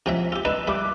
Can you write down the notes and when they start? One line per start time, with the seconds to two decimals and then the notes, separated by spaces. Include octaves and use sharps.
0.06 C3 F3 F#3 E5 G#5
0.32 F4 G4 E6
0.45 D#4 B4 D5 E6 E7
0.67 G3 E5 B5 D6 F#6